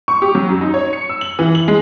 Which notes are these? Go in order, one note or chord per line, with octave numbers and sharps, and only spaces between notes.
C#6
G4
F#3
F#2
D#4
C#5
C#7
E6
F#7
E3
F#7
G#3